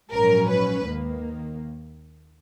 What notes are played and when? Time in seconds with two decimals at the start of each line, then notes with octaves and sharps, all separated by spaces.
0.13 A#1 G#2 F#3 C#4 A#4
0.50 B4
0.86 D#2 D#3 A#3